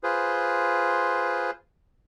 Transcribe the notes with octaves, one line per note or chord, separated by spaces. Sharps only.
F4 G#4 B4 C5